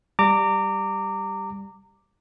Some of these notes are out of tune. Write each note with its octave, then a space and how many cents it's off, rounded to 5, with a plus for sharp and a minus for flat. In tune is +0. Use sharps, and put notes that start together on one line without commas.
G3 +0 A#5 -25 D6 +0